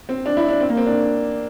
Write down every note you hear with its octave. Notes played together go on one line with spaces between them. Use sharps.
C4
D4
E4
D4
C4
A#3
C4
D4